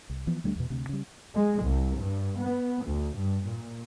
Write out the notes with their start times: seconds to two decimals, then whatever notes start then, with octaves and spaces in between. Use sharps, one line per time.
0.10 C2
0.27 E3 F3 B3
0.44 D2 G3 A3 D4
0.56 E2 B2
0.70 D2 C3
0.89 C#3 G3
1.34 G#3
1.63 C2
1.96 G2
2.39 B3
2.84 D2
3.15 G2
3.45 A#2